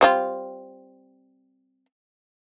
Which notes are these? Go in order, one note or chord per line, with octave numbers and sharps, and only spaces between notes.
G3 C4 F4